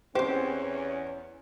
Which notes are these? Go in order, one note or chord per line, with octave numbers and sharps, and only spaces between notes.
E2 C4 C#4 G4 C5